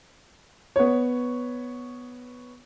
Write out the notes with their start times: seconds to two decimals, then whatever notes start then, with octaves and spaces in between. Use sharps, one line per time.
0.76 B3 C#5